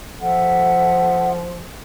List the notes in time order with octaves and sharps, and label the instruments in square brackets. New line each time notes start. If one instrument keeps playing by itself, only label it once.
[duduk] F3 [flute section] A4 E5 F#5